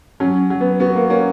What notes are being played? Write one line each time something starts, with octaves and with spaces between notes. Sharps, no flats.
F#3 C#4
F#3
B3
B3 F#4
A#3
A#3 C#4